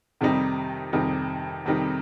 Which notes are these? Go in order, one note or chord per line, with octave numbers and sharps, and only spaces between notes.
F2 C3 D#3 G3 D#4
F2 C3 D#3 G3 D#4
F2 C3 D#3 G3 D#4